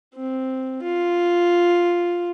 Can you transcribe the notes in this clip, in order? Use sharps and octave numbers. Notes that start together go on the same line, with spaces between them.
C4
F4